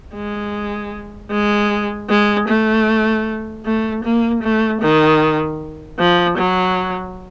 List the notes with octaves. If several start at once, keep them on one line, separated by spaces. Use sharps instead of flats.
G#3
G#3
G#3
A3
A3
A#3
A3
D#3
F3
F#3